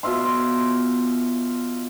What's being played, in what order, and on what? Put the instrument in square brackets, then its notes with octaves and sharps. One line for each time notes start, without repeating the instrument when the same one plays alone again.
[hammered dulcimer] B2 F4 E5 C6